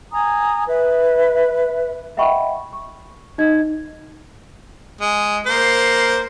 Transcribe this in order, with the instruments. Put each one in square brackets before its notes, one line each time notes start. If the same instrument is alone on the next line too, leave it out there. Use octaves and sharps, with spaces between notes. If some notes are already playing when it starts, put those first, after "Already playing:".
[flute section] G#5 A#5 D#6
B4 E5
[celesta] D#5 E5 F#5 G5 B5 C#6
C#6
D#4 D#5 G#6
[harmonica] G#3
A#3 C5